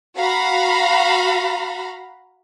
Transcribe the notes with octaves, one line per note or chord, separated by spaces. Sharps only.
F#4 F5 A#5 B5